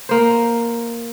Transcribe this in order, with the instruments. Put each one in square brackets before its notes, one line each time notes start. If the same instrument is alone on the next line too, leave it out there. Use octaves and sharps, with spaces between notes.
[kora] A#3 C5